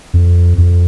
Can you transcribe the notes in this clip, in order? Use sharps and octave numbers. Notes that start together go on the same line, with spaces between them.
F2
F2